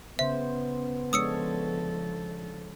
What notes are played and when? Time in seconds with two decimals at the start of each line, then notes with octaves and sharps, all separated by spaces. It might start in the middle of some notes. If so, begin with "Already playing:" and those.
0.19 C#3 B3 C5 E5
1.13 F3 G#3 D4 A4 C#5 D#6 E6 C#7